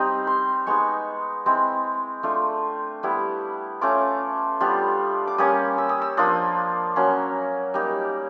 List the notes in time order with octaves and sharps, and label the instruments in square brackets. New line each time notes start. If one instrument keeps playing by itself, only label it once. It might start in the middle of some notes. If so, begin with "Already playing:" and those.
Already playing: [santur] G3 C4 D#4 D#6
C6
G#3 B3 D#4 C#6
G#3 C4 E4
A3 D4 F4
G3 B3 E4
A3 C#4 F4 D6
G3 B3 D4 F4
D6
G3 A#3 C#4 D#6
E6
D#6
E6
F3 A#3 D4 F4 D#6
F#3 A#3 C#4
G3 A#3 D#4